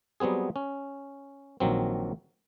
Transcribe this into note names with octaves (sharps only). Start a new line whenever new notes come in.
F#3 G3 B3 C4 G#4
C#4
A#1 D#3 F#3 C4